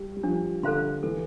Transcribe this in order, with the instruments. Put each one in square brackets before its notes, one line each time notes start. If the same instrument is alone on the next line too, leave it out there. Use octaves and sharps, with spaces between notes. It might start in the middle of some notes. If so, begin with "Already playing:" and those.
Already playing: [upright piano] G3
G3
[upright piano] F3 [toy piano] D4
[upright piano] D3 [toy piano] A4 C5 F5 C6
[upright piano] E3 [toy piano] A4